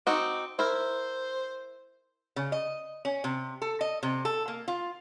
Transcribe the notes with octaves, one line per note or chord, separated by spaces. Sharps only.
C4 D#4 F#4 D6
E4 A#4 C5
C#3
D#5
C#4
C3
A4
D#5
C3
A4
A#3
F4